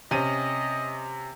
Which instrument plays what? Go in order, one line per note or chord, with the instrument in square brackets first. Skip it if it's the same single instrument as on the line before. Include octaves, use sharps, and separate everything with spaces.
[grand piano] C3 C#4 D#7 [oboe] D#5